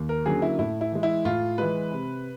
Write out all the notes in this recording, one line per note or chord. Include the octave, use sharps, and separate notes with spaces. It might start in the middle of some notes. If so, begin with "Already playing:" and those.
Already playing: D#2
A#4
D3 F#3 A#3 C#4 G#4
E4
A2 E4
E4
E3 G#3
E4
A2 F4
E3 G#3 B4
C3